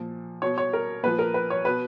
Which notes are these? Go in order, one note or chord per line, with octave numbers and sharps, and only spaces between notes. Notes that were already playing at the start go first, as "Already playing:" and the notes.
Already playing: A#2 F3
B2 C#5
C#5
A#4
A#2 F3 B4
A#4
B4
C#5
B2 B4